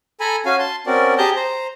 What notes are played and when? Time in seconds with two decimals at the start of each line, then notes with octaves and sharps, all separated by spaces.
0.20 A4 G#5 A#5 B5
0.46 C#4 F#4 F5 G#5
0.59 A5 C6
0.86 C4 C#4 F#4 A#4 D5
1.18 G4 G#4 A5 A#5 G6
1.36 C5 A#5